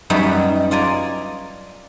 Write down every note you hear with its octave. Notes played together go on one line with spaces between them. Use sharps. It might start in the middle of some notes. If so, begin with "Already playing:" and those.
F#2 G3 B3 D#4 C#5
F4 D5 G#5 A#5